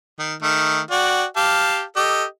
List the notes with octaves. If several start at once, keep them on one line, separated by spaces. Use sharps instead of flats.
D#3
D#3 A3
F#4 D5 G5
G4 F5 A5
G4 A4 D#5